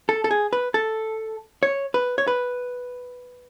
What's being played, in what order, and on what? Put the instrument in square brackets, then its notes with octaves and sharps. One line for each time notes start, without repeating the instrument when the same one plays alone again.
[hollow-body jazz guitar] A4
A4
G#4
B4
A4
C#5
B4
C#5
B4